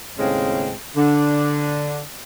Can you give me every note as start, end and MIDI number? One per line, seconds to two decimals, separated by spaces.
0.18 0.72 39
0.18 0.72 45
0.18 0.72 49
0.18 0.72 56
0.18 0.72 60
0.18 0.72 61
0.97 2.00 50
0.97 2.00 62